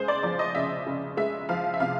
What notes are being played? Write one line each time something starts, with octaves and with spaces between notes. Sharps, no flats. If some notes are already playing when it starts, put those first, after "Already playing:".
Already playing: C#3 G#3 G#4 C5
D5
F3 D5
D#5
C#3 E5
C#3
G#3 E5
F3 F5
E5
C3 F5